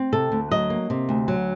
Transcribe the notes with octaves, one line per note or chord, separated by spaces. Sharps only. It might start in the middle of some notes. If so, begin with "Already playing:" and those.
Already playing: C4
C3 A4
D2
F#3 D#5
A#3
C3
D2
F#3